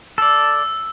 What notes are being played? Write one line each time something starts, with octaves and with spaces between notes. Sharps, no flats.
A4 D5 E6